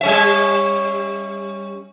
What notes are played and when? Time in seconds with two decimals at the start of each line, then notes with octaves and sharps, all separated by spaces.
0.01 G3 C#4 E5